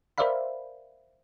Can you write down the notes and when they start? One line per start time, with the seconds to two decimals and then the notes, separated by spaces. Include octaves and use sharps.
0.18 A#4 C5 D5 E5 F5 B5